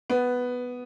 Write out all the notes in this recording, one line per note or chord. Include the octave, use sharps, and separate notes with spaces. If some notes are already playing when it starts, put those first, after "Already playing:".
B3